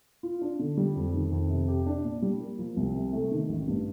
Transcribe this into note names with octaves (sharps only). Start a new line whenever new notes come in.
F4
D4
D3
G3
F2
D#3
F2
C3
G4
D4
A#2
G3
A#3
F3
C2
C3
A3
D#3
A1
G2